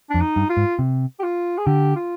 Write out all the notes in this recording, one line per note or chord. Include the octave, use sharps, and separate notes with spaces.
F2 D4
D#4
G2
F4
G#2
C3
G4
F4
G#4
D3 G4
F4